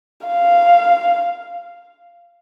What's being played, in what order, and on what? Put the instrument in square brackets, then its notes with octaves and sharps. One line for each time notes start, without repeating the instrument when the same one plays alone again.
[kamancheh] F5